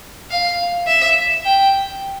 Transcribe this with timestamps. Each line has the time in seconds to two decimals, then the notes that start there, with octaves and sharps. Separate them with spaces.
0.30 F5
0.87 E5
1.45 G5